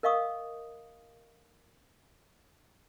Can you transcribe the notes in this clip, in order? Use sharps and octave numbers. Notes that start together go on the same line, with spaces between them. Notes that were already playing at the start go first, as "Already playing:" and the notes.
A#4 D#5 F5 C#6 D#6